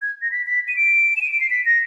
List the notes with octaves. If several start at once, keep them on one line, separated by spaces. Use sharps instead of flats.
G#6
A#6
B6
B6
D#7
D7
E7
D#7
D7
C7
B6
A#6